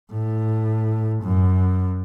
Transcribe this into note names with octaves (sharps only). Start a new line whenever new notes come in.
A2
F#2